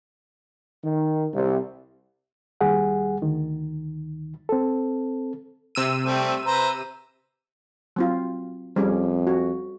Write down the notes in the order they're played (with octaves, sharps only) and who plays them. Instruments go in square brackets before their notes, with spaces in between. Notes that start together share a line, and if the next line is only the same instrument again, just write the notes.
[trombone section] D#3
C2
[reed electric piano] D#2 G3 G#4 F#5
D2 D#3
C4 A4
[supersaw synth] C3 E6 D#7
[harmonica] G3 A3 C4
B4 C5 A#5
[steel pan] F#3 C4 F4
[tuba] F2 [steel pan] G3 C#4 G#4
[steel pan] F#4